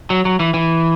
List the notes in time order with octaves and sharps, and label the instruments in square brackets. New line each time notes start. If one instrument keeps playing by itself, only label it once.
[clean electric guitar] F#3
F#3
E3
E3